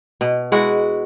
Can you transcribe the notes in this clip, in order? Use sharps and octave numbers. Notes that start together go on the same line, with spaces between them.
B2
G#3 E4 F#4